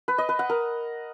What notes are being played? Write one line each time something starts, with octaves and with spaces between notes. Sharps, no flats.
B4
D#5
B4
F#5
A#4